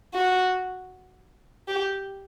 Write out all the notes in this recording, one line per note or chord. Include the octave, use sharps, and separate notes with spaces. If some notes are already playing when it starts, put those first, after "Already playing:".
F#4
G4